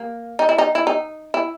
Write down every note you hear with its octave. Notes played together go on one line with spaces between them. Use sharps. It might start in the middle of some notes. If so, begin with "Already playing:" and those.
Already playing: A#3
D#4
E4
D#4
E4
D#4
E4